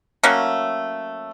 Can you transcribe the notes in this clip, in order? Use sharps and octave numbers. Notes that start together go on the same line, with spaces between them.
F#3 A3 A#3 C#4